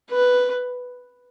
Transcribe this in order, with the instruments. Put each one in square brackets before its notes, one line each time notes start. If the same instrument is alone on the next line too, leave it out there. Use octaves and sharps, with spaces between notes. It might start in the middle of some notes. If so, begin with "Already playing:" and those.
[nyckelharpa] B4